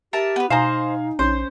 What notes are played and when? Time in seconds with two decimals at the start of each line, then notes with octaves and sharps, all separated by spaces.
0.13 G4 A#4 E5 A5
0.36 B3 B4
0.50 B2 D#4 C5 D#5 F5 G#5 A#5
1.19 A#1 C#4 C5